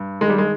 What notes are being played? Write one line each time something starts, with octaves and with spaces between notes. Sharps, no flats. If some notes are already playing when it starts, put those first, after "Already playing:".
Already playing: G2
D#3 G#3
G3
G#3